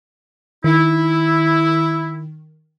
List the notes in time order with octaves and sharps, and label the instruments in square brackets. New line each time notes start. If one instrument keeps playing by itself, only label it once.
[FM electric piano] D#3 [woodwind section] E4